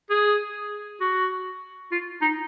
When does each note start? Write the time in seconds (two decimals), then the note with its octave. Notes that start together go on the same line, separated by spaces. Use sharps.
0.10 G#4
1.01 F#4
1.92 F4
2.21 D#4